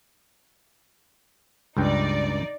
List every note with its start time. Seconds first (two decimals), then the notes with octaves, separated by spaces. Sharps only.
1.77 C#2 G2 D#4 D5 G5